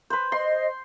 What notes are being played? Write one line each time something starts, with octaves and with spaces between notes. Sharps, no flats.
B4 C5
C5 D#5 C6